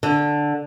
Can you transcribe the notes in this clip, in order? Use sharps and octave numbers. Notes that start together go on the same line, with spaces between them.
D3